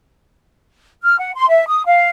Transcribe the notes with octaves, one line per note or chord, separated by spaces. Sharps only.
F6
F#5
C6
E5
D#6
F5